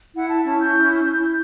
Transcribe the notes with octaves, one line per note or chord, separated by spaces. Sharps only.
E4 F#5
A5
C#4 A5
G6
E4
E4